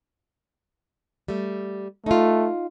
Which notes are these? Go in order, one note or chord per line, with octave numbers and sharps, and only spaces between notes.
G3 A3
A3 D#4 F4